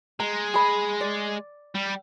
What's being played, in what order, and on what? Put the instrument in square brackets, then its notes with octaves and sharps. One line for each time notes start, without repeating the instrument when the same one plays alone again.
[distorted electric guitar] G#3 [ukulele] A#5
[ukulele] G#4 B5
D5
[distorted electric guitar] G3